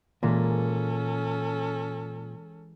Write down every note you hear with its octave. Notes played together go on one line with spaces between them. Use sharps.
A#2 E3 G#3 C#4 A4 A#4